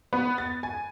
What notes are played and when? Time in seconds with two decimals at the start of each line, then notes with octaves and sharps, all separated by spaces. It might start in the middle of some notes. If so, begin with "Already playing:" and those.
0.13 B3
0.38 A6
0.63 G#5